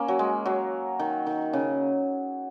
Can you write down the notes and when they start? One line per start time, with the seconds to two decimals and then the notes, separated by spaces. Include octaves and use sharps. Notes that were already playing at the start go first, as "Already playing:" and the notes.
Already playing: A#3 C#4
0.08 F#3
0.19 G#3
0.46 F#3
0.99 D#3
1.26 D#3
1.53 C#3